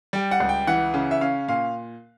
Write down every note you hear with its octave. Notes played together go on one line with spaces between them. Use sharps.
G3 G5
F#5
C#2
G5
E3 F#5
C#3
E5
C#4 F5
A#2 F5